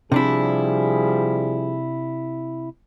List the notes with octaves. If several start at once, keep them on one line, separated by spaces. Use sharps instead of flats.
C3 F3 G3 D4 E4 G#4